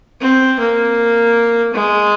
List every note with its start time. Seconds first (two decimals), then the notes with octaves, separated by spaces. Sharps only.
0.21 C4
0.59 A#3
1.74 G#3